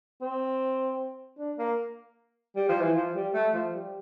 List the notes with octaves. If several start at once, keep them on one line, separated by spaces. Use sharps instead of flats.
C4
D4
A#3
G3
F3
E3
F3
G3
A3
F3
G3